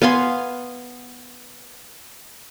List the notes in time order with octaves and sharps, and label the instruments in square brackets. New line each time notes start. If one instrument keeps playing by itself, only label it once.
[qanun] B3 F5 G#5 C6